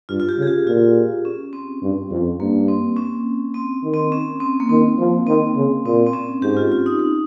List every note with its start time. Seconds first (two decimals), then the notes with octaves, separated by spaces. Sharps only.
0.09 G2 F4
0.20 F4
0.29 G4
0.38 C#3
0.42 G#4
0.47 G4
0.67 A#2 F4
1.25 C#4
1.53 C4
1.82 G2
2.10 F2
2.39 G2 A#3
2.68 C4
2.97 C#4
3.54 C4
3.84 D#3
3.94 C4
4.12 C#4
4.40 C4
4.60 A#3
4.69 D#3 C4
4.98 F3
5.27 D#3 C4
5.56 C#3
5.85 A#2 C4
6.06 C4
6.13 C#4
6.42 G#2 G4
6.57 F4
6.72 F4
6.86 D#4
6.99 D#4